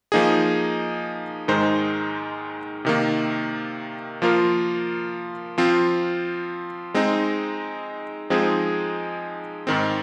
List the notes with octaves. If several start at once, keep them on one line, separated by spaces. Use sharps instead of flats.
F3 A#3 D#4 G#4
G#2 D#3 G#3 D#4 C5
C3 D#3 A#3
F3 A#3 F4 A#4
F3 C4 F4
G#3 C4 D#4
F3 G#3 C4 D#4 G#4
G#2 D#3 C4